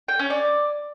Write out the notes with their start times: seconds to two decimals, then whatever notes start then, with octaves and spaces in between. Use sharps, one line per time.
0.08 G5
0.19 C#4
0.30 D5